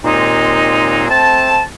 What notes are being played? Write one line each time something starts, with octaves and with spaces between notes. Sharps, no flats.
D#2 A#2 G#3 C4 D#4
A3 C4 A5